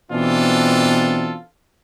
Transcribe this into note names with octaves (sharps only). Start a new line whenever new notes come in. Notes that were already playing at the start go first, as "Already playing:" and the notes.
B2 E3 C4 D4 F4 A4